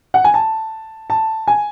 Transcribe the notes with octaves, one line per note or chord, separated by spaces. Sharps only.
F#5
G#5
A5
A5
G#5